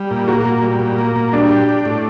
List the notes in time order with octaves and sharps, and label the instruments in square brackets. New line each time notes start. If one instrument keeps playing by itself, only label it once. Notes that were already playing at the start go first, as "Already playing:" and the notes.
Already playing: [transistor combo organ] G3
A#2
[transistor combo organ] A#3 [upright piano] F#4
[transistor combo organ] A#2
G3
A#2
A#3
A#2
[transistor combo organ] G3 [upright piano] D4
[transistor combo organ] G4
D4
A2